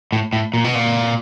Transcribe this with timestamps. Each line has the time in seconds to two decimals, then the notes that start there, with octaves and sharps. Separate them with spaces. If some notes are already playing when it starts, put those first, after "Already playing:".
0.12 A2
0.33 A2
0.54 A#2
0.64 B2
0.75 A#2